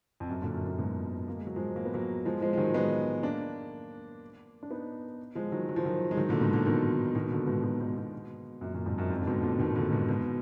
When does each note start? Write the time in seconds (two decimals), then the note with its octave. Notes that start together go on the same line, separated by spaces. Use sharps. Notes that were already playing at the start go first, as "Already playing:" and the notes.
0.20 F2
0.29 F#2
0.42 A#2 D3
0.54 F#2
0.66 F#2 A#2
0.78 G#2 B2
1.28 A#3
1.37 G#3
1.47 F#3
1.56 F3 G#3
1.76 A#3
1.85 B3
1.94 F#3 A#3
2.25 F3 G#3
2.41 F3 G#3
2.53 G#3
2.58 D#3 F#3
2.74 G#3 B3
3.23 A#3 D4
4.63 D4
4.70 B3 D#4
5.35 F3 G#3
5.52 D#3 F#3
5.69 F#3
5.76 F3
5.85 D#3 F#3
6.11 G#3
6.17 D#3 F#3
6.29 A#2 D3
6.41 G#2 B2
6.54 A#2 D3
6.66 B2 D#3
7.15 B2 D#3
7.31 A#2 D3
7.47 G#2 B2
7.63 G#2 B2
7.80 G#2 B2
7.97 G#2 B2
8.61 F#2 A#2
8.74 F#2 A#2
8.86 F2 G#2
8.98 F#2
9.10 F2 G#2
9.19 D3
9.27 G#2 B2
9.43 A#2 D3
9.59 B2 D#3
9.76 A#2 D3
9.92 G#2 B2
10.08 G#2 B2